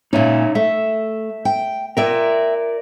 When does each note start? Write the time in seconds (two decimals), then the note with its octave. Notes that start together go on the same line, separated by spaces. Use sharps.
0.13 A#2 C#4 D#4 C#5 E5
0.55 A3 E5
1.45 G5
1.97 A#4 D5 E5 G5